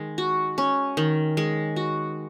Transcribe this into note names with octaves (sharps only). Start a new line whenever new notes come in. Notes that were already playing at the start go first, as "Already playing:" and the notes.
Already playing: D#3 G#3
F#4
C#4
D#3
G#3
F#4